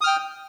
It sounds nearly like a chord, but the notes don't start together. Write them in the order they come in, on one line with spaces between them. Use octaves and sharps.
D#6 F6 G5